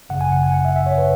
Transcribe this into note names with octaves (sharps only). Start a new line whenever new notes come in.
G#1 F#2 C#3 F#5
G#5
F#5
G#5
F#5
E5
E5
C#5
B4